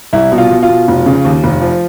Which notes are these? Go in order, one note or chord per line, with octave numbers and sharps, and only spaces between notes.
C2 E4
B2
F4
B2
F4
B2
F1
C#3
D#2
F1
F3